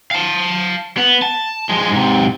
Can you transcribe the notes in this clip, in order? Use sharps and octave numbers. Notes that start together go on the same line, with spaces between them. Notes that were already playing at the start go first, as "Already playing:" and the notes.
F5 A5
B3
A5
F3 G#3
G#2 C3